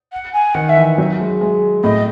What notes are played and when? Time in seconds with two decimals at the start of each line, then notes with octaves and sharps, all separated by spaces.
0.13 F#5
0.33 G#5
0.55 D#3 F#5
0.69 E5
0.77 E3
0.98 F#3
1.20 G#3
1.41 G#3
1.84 A2 D#5